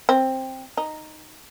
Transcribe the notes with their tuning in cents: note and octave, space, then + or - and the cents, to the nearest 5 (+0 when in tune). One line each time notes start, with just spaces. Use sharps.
C4 +10
D#4 -5